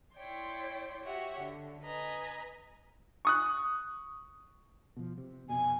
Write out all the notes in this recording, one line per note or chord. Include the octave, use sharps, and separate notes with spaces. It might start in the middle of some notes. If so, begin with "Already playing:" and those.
E4 C#5 D5 G5 C6
F#4 G4 C#5 E5 F#5
D3
B4 D#5 G#5 A#5
C#6 D#6 F#6
B2 F3
C3
F1 B2 G#5